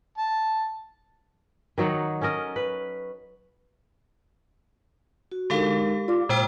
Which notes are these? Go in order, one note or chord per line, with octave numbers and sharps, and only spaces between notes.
A5
D#3 F#3 D#4 F#5
C#4 A4 A#4 D#5
B4
F#4
D3 G#3 D#4 G4 A4 A#4 F5
F4 D5 D6
A#2 G#3 C5 G5